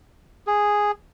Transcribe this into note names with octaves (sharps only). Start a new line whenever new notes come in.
G#4